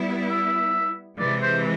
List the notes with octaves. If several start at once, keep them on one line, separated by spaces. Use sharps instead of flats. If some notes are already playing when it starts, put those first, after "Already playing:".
Already playing: G3 B3 E4
E5
C3 E3 G#3 D5
C5